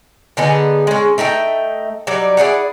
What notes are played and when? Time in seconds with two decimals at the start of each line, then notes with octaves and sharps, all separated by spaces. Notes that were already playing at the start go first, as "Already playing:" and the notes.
0.37 D3 B3 D#4 G#4
0.87 G#3 C#4
1.18 A3 D#4 E5 G5
2.07 F#3 G3 D#4 D5
2.37 E4 G#4 D5 F#5